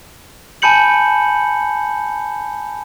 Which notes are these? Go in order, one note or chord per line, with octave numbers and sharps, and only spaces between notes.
G#5 A5 B5 G6 C#7 F#7